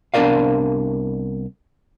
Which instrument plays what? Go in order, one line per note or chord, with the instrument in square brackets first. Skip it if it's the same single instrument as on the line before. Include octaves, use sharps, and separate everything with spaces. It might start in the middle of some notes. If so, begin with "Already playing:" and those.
[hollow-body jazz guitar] C2 B3 D4 A#4 D5 F5